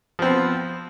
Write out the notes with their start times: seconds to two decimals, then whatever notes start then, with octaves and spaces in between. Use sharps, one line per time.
0.19 F3
0.22 C4
0.25 B3